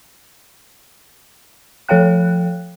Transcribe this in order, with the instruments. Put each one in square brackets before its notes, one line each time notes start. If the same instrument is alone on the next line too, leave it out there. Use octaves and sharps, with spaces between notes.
[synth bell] F3 A4 C#5 F5 G5 F#6